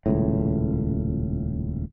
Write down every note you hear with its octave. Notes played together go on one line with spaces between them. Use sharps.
D#1 C#2 A2